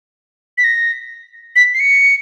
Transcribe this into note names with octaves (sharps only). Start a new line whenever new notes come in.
B6
A#6
B6
C7
C#7